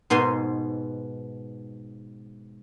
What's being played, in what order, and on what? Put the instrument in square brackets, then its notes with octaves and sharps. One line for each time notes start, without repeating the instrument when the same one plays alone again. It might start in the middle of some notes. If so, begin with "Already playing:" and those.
[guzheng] G#2 B2 C5 G#5 C6